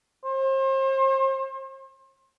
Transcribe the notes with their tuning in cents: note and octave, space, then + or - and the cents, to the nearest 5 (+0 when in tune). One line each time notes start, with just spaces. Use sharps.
C5 +35